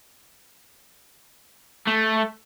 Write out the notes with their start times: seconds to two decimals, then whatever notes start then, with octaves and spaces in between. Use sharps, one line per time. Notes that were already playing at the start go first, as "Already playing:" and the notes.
1.87 A3